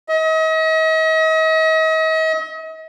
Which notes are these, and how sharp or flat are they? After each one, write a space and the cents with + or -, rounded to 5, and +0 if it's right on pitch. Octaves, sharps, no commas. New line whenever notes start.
D#5 +40